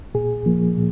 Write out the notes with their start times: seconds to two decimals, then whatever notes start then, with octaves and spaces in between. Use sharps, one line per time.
0.15 A#2 G#4
0.46 F3 A#3
0.77 A#2